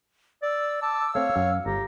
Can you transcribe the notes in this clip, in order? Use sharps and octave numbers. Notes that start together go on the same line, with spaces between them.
D5 E6
A5 D6
A3 C4 C#5 F5
F#2
G1 G4 A#5